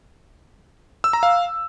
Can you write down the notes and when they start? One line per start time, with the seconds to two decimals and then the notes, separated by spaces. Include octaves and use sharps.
1.04 E6
1.13 A#5
1.23 F5